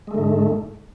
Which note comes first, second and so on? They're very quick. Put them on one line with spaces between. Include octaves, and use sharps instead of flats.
G#3 A3 D3 G#2